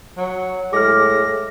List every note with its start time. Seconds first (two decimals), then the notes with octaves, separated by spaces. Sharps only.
0.18 F#3
0.73 A2 G#3 D6 F6 A#6